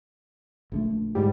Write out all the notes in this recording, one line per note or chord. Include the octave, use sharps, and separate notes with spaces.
A#1 D3 A3
G#2 G3